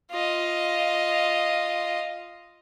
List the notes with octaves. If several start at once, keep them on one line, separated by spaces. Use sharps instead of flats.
F4 D#5